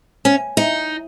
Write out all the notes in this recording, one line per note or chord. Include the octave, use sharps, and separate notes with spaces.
C#4
D#4